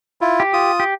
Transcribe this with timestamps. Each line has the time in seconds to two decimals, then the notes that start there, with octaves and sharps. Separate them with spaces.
0.21 E4 F4
0.40 G4
0.53 F4 D#6
0.80 G4